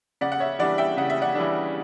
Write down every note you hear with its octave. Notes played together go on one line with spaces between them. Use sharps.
C#3 D5 F#5
F#5
C#5 E5
E3 G3 D4 D5 F#5
E5 G5
C#3 F#5
E5
D5 F#5
E3 G3 D4